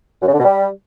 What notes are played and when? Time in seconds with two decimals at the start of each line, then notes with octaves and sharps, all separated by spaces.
0.22 F#2
0.28 C#3
0.34 D3
0.39 B2
0.45 G3